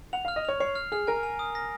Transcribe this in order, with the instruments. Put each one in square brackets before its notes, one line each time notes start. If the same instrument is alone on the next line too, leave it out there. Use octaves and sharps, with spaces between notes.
[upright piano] F#5 [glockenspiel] F7
[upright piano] F5 [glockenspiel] F6
[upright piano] D#5
[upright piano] C#5 [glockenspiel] F7
[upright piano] C#5 [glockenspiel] C7
[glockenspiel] F6
[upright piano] G#4 [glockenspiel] F6
[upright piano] A#4 [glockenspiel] G#5
[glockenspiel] G#5
D#6
A#6